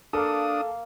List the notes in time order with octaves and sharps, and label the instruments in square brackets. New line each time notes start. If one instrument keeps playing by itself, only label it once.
[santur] A#3 F5 [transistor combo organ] D4 D#6 [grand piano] A4